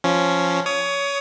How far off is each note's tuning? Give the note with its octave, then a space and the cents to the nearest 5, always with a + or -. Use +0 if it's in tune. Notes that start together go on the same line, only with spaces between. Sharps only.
F3 +0 C#4 +0
C#5 +20 D#6 +0